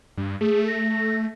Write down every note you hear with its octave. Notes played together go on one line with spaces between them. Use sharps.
G2
A3 G#4
A#6